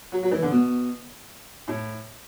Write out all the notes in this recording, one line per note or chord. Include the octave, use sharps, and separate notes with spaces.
F#3
F#3
E3
D3
B2
A2